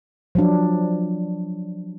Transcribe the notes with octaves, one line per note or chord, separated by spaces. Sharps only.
F3 F#3 D4